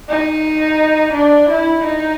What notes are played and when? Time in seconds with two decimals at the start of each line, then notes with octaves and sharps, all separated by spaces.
0.09 D#4
1.14 D4
1.50 E4
1.85 D#4